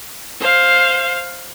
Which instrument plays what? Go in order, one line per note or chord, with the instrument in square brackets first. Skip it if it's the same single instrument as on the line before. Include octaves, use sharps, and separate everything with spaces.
[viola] C5 F5